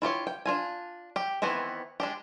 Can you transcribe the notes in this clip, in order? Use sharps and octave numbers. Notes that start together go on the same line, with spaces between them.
E4 F4 G4 C#5
G5
D4 F4 G#5
G4 G5
D#3 E3 B3 C4 E4
G#3 D4 G4